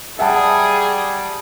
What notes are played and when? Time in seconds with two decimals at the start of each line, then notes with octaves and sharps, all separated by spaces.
0.19 G3 G#4 E5 F#5 A5